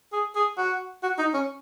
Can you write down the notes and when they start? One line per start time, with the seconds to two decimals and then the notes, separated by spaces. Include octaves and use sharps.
0.13 G#4
0.35 G#4
0.58 F#4
1.03 F#4
1.18 D#4
1.34 C#4